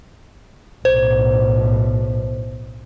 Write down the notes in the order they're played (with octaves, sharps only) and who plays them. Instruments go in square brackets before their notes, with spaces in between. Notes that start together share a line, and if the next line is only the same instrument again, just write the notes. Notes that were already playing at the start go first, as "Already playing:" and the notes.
[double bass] B1 A2 [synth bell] C5